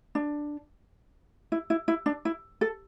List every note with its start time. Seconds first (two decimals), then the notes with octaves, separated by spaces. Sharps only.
0.15 D4
1.52 E4
1.70 E4
1.88 E4
2.06 D4
2.25 E4
2.61 A4